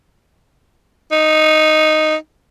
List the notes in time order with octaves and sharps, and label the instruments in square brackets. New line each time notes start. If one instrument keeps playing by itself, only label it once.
[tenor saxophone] D#4